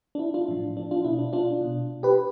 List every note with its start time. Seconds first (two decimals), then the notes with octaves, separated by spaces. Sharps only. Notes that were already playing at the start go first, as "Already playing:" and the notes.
0.15 D4
0.19 E4
0.34 D4 F4
0.48 A2 F3
0.77 D4
0.91 D4 F4
1.05 B2 E4
1.19 D4
1.33 D4 F4
1.61 B2
2.03 G4 B4